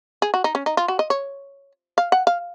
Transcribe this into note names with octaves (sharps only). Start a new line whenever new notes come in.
G#4
F#4
D#4
C#4
D#4
F4
F#4
D#5
C#5
F5
F#5
F5